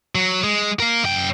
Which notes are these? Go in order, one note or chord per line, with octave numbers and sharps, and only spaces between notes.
F#3
G#3
A#4 F5
F#2 G5